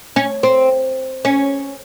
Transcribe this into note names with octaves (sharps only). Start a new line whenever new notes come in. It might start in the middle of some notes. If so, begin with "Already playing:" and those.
C#4
C4
C#4